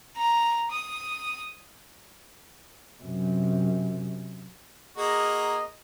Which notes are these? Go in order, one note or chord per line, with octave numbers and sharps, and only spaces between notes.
A#5
D#6
F#2 C3
A#3 F#4 G#4 D#5 A#5